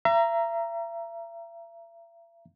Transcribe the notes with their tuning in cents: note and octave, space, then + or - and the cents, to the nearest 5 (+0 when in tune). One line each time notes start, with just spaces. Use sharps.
E5 +40 A#5 +0